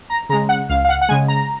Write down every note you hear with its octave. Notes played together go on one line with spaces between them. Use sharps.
A#5
C#3 G#3 A#5
F#5
C#2 F5
F5
F#5
F#5
C#3 G#3 G#5
A#5